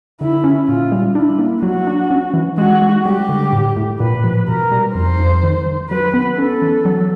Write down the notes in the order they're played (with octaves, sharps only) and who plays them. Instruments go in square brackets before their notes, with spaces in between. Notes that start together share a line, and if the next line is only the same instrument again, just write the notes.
[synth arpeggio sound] D3 [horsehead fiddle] E4
[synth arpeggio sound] C#4
[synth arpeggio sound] A#2 [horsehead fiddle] F4
[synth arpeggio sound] G3
[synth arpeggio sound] D4 [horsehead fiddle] E4
[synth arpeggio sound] A#3
[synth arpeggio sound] F#3 [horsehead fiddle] F#4
[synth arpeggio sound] D4
C#4
E3
[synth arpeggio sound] G#3 [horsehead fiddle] F#4
[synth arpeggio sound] G#3
[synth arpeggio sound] G3 [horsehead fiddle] G4
[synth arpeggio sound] D3
A2
A2
[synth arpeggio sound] A#2 [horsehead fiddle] B4
[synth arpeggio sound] F3
[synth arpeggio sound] B2 [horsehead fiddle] A#4
[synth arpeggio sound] G3
[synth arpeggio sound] F2 [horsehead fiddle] C5
[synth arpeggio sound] F2
D#3
D#3
[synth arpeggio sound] F#3 [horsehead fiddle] B4
[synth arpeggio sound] B3
[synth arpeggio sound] C#4 [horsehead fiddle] A4
[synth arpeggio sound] E3
F#3